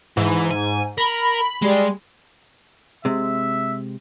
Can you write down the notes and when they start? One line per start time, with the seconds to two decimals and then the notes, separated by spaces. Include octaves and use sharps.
0.17 G#2 E3
0.51 G#5
0.98 A#4 B5
1.62 G3 G#3
3.05 C3 G#3 E5